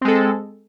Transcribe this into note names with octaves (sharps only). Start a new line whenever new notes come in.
G#3 C4 A4